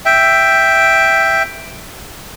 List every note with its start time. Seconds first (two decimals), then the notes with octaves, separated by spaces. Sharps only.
0.06 E5 G5